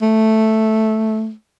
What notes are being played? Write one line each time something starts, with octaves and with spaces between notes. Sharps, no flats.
A3